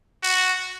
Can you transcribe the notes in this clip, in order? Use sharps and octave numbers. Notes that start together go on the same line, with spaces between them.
F#4